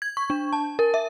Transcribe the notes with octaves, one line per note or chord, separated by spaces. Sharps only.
G#6
C#6
D4
A5
A#4
E5